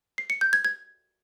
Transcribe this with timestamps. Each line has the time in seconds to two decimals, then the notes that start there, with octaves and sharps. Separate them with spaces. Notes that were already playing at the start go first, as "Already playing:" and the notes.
0.18 C7
0.30 C#7
0.41 G6
0.53 G#6
0.65 G#6